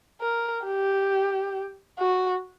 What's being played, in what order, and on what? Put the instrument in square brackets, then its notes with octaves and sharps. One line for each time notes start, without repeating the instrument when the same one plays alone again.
[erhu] A#4
G4
F#4